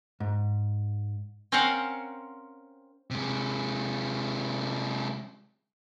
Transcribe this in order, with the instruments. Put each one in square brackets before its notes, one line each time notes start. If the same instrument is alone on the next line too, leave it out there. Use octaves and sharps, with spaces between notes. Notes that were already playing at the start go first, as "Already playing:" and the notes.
[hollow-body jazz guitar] G#2
[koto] C4 C#4 A#4 C5 F5 F#5
[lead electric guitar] C3 G#3